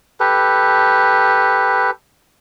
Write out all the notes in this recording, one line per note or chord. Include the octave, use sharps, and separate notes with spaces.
G4 A4 B4